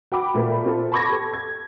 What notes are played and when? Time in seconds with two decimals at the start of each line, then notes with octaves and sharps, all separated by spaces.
0.12 F#4 G5 B5 D6
0.34 A#2 A3 A#4 B5
0.64 C4 F4 A4
0.92 A5 B5 C#6 D6 G#6 A#6
1.09 G4 A4
1.33 G#6